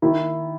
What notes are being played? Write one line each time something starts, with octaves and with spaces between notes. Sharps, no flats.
D#3 E4